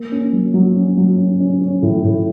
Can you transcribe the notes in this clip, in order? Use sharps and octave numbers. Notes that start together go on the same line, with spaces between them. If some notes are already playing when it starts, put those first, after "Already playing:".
Already playing: A#3
C#4
F#3
F#3
C#4
F#3
C#4
C#4
C#4
A2
A2